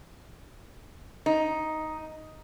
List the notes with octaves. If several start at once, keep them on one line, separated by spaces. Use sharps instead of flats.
D#4